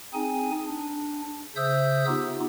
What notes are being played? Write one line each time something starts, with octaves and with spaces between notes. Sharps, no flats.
C4 D#4 G#4 G#5
D4
C#3 C5 E5 D#6 E6 G6
B3 D#4 F4 G4